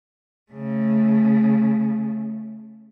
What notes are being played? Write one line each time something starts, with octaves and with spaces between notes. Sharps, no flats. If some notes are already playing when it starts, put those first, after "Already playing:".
C#3 A3